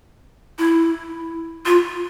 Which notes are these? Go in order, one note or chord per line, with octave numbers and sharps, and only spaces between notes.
E4
F4